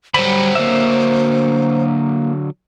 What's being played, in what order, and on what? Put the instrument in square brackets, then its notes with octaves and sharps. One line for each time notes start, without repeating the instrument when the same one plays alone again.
[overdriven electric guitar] D3 F#3 [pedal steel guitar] G3 B5 [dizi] C5
[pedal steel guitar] A#3 E5